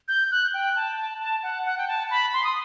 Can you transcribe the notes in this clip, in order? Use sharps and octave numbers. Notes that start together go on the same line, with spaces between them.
G6
F#6
G5
A5
A5
A5
F#5
F#5
G5
A5
B5
C6
D#6